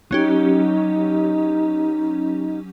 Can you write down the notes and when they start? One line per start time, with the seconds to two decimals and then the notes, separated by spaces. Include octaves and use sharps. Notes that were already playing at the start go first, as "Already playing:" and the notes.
0.11 F#3 C#4 D#4 G4